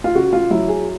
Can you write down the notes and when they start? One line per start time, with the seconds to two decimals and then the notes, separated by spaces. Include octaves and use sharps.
0.04 F4
0.15 C#3 F#4
0.33 F4
0.50 F#3 E4
0.68 G#4